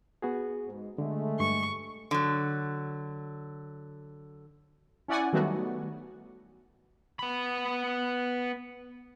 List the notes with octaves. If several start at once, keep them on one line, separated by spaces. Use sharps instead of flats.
B3 F#4 G#4
G#2
D3 G#3 A3
G2 C#6
D3 F#3
C#4 E4 D5 F#5 G#5
D#3 F#3 G3 A3 B3 F#4
B3 B5